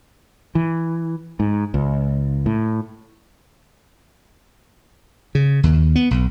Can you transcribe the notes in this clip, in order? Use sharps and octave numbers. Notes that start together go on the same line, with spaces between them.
E3
G#2
C#2
A2
C#3
D#2
B3
B1